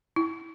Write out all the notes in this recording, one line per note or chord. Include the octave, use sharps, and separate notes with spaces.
E4